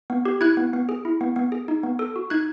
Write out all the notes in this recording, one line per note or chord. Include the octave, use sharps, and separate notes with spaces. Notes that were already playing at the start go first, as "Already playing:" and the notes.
B3
G4
E4 F#6 G#6
B3
B3
G#4
E4
B3
B3
G#4
D#4
B3
A4
F#4
D#4 F#6 G#6